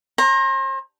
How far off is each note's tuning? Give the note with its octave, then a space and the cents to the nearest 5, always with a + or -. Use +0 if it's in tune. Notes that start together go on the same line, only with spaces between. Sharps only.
C5 +40 A#5 +0